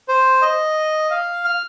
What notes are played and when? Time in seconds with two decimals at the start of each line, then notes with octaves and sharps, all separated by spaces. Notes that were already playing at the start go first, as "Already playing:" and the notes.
0.08 C5
0.42 D#5
1.10 F5
1.45 F6